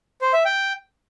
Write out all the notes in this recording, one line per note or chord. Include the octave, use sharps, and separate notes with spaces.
C5
E5
G5